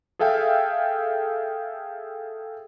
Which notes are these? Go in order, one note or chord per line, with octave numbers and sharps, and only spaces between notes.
G#4 A4 E5 F5 G5